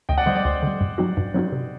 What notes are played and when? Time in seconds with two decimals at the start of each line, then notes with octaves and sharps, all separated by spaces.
0.09 D2 D#5 G5
0.18 D5 F#5
0.26 D3 G3 C5 D#5
0.35 D5
0.45 D2 C5
0.63 D3 G3
0.81 G2
0.98 F#3 C4 D#4 F#4
1.17 G2
1.34 F#3 C4 D#4 F#4
1.52 C3